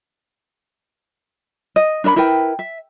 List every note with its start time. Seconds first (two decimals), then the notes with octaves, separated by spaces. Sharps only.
1.76 D#5
2.04 D4 A#4 E5 B5
2.16 E4 A#4 B4 G5
2.59 E5